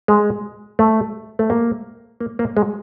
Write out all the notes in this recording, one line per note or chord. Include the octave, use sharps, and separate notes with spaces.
G#3
A3
A3
A#3
A#3
A#3
G#3